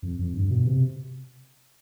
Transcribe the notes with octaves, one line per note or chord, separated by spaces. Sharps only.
F2
F2
G2
B2
C3